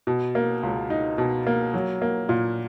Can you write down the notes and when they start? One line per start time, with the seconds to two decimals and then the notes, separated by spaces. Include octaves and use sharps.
0.07 B2
0.35 A#3
0.63 C#2
0.90 D#4
1.18 B2
1.47 A#3
1.74 F#3
2.02 A#3
2.29 A#2